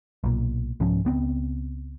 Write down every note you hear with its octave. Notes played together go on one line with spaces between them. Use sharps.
B1 A#2
C2 G#2 F3 C#4
C#2 B3 C4